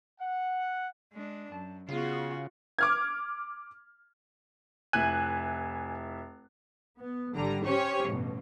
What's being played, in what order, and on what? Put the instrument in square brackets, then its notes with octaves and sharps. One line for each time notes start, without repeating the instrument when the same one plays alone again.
[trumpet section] F#5
[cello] G#3 D4
[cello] F#2 [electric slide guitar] A5
[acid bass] C#3 [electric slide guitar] B3 G#4 F5 [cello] F4 F#4
[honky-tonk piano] D6 F6 G#6
[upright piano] F1 E4 F#6 [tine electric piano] G#5
[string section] B3
G#1 D3 G3 A#5
C#4 G4 C5 C#5
A1 G2 B2